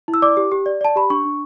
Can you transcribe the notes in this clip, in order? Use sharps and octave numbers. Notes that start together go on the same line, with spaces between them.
E4
E6
D5 D6
G4
G4
D5
D5 A5
G4 B5
D4 C#6
D4